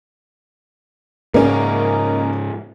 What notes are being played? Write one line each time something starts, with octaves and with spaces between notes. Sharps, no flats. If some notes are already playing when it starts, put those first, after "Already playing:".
G#2 C#3 A#3 C#4 D#4